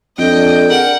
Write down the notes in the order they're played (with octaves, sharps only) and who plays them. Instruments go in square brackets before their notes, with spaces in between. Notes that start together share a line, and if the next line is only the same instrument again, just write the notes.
[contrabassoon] F2 [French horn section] D4 A4 [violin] D#5 [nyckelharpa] G5
[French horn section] D4 G#4 [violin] A#4 F#5